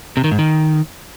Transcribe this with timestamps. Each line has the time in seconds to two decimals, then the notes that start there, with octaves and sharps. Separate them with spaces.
0.17 C3
0.24 D#3
0.31 G#2
0.39 D#3